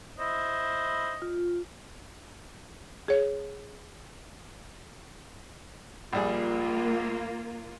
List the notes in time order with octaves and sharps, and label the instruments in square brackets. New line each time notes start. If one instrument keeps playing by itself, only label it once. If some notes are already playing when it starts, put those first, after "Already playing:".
[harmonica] E4 C5 [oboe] D#5
[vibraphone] F4
[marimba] G#4 C#5
[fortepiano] A#1 G3 G#4 [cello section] A#3 F4